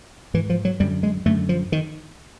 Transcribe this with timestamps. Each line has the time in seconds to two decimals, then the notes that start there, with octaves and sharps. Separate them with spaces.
0.34 G#2 E3
0.50 F3
0.65 F#3
0.80 F#2 G3
0.83 D3
1.03 G#3
1.26 F#2 D3 A3
1.49 F3
1.72 D#3